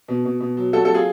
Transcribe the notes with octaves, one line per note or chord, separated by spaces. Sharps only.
B2
B2
B2
F#3
F#3 F#4 A4
F#3 A4
F4 G#4